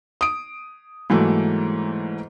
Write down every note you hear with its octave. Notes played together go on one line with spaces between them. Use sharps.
D#6 D7
G#2 E3 F#3 A3 A#3